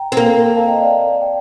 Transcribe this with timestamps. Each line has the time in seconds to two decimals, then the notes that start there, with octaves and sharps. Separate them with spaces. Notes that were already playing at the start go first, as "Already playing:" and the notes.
Already playing: G5 A#5
0.12 C4
0.17 A#3
0.44 A#5
0.56 F5 A5
0.68 D#5 G5
0.81 D5 F5
1.21 G5